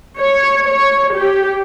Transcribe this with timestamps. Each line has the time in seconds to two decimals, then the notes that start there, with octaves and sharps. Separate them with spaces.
0.19 C#5
0.69 C#5
1.17 G4